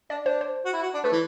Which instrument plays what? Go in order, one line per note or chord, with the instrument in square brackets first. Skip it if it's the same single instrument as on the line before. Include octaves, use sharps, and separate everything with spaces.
[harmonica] D4 [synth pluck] D5
[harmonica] D4 [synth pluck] C5
[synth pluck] C5
[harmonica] F#4
E4
F#4
D4
[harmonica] A3 [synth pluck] B4
[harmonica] E3